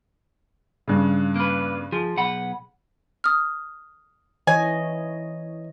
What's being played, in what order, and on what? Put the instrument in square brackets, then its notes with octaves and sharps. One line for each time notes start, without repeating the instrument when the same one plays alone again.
[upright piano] G2 C#3
[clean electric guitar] A#3 B4
[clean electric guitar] F3 [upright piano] G#4
[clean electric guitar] B1 F#5 B5
[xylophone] D#6 F6
[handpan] E3 C#5 D#5 [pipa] G#5